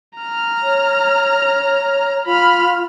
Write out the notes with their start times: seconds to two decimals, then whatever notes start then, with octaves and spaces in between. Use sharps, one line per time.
0.19 A#5 F6
0.63 C#5
2.26 F4 B5 F6